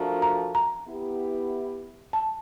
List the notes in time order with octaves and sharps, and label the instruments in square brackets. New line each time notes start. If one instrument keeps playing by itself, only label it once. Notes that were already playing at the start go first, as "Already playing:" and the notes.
Already playing: [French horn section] F3 A3 D4 F#4 A#4
[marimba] A#5
A#5
[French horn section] B3 E4 G4
[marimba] A5